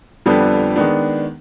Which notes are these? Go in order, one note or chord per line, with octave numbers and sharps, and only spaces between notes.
F2 D3 G3 B3 D4
D#3 G#3 B3 D4